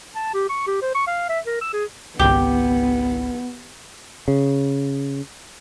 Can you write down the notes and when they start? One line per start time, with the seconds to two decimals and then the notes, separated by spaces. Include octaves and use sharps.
0.15 A5
0.34 G4
0.49 C#6
0.67 G4
0.82 C5
0.95 C#6
1.07 F5
1.29 E5
1.46 A#4
1.61 E6
1.73 G#4
2.19 G#1 C#2 B3 G4
4.28 C#3